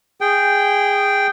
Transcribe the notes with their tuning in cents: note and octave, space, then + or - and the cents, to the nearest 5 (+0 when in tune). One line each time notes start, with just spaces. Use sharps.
G#4 -15 G5 -5